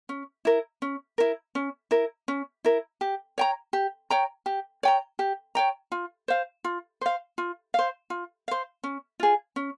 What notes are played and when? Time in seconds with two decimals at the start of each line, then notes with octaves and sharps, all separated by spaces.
0.09 C#4
0.45 E4 A#4
0.82 C#4
1.18 E4 A#4
1.55 C#4
1.91 E4 A#4
2.28 C#4
2.65 E4 A#4
3.01 G4
3.38 C#5 G5 A#5
3.73 G4
4.10 C#5 G5 A#5
4.46 G4
4.83 C#5 G5 A#5
5.19 G4
5.55 C#5 G5 A#5
5.92 F4
6.28 C5 F5
6.64 F4
7.01 C5 F5
7.38 F4
7.74 C5 F5
8.10 F4
8.48 C5 F5
8.84 C#4
9.20 F4 G#4
9.56 C#4